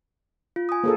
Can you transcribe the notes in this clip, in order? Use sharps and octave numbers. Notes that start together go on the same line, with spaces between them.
F4
G#5 D#6
A#3 G#4 A4